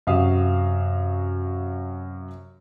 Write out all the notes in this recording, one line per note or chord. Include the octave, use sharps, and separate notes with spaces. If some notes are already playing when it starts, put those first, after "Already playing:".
F#2 C3 F#4 E5 F5 D#6